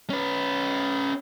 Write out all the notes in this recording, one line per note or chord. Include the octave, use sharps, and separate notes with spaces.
C#4 B4